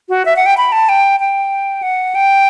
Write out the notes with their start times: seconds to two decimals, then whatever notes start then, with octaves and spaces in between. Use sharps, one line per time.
0.09 F#4
0.25 E5
0.36 F#5
0.46 G5
0.57 B5
0.72 A5
0.89 G5
1.20 G5
1.83 F#5
2.15 G5